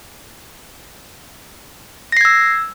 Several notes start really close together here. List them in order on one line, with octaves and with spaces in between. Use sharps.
A#6 C7 G#6 E6